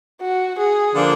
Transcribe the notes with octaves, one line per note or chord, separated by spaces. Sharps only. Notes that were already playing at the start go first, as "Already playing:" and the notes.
F#4
G#4
D3 F3 A#3 D4